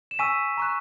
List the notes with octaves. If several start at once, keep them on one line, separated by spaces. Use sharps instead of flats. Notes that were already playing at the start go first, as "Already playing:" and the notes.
E7
G#5 C#6 E6 B6 D#7
A#5 C#6 F#6